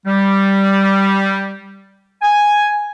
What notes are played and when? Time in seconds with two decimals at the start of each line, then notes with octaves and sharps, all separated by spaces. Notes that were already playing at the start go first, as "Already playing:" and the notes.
0.06 G3
2.22 G#5